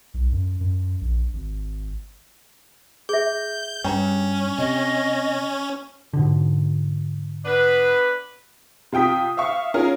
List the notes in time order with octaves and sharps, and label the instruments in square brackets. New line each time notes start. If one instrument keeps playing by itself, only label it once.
[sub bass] B1
F#2
F#2
A#1
G#1
[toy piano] G#4 E5 [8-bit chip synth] G6
[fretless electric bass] G2 [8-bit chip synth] C#4 [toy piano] G5 A#5
[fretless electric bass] C3 [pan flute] D#5
[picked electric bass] G#2 B2 D3
[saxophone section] B3 D4 B4
[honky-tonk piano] C3 F4 G5 D#6 B6
E5 F5 C#6
C#4 F4 G#4 A#4